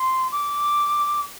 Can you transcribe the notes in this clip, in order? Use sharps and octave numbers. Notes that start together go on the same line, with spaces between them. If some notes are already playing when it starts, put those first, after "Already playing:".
Already playing: C6
D6